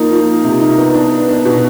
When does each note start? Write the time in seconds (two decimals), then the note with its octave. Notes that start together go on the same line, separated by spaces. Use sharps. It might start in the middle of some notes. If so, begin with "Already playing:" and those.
Already playing: F3 A#3 D#4
0.10 F3
0.27 F3
0.44 C3
0.61 D#4
0.77 B3
0.94 D4
1.12 B3
1.28 D4
1.45 B2